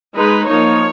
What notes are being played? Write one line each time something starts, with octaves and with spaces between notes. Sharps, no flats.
G#3 D#4 B4
F3 A#3 D#4 C#5